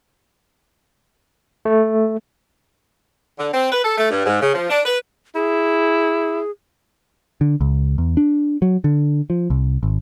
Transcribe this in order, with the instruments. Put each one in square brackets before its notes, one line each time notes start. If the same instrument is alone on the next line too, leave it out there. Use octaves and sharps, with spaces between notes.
[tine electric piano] A3
[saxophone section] D3
C4
B4
A4
A3
G2
G#2
C#3
F3
D4
B4
[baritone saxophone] E4 [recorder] G#4
[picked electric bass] D3
C#2
E2
D4
F#3
D3
F3
C2
G#1